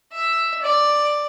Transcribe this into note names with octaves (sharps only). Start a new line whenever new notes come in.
E5
D5